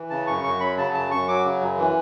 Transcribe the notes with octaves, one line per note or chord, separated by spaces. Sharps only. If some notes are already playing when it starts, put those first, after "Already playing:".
Already playing: E3
C#3 A5
F#2 C#6
F#2 C#6
F#3 B5
C#3 A5
F#2 A5
F#2 C#6
F#3 D6
C#3
F#2
E3